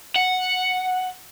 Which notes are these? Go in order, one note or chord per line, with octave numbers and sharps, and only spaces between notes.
F#5